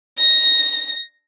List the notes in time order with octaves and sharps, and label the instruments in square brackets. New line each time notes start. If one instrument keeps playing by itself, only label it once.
[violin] A#6